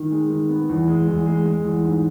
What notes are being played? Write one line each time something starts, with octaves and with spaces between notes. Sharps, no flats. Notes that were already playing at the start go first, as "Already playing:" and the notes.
Already playing: D#3
G#3
D#3
B3
E2
G#3
E2
G#3
G#3
E2
G#2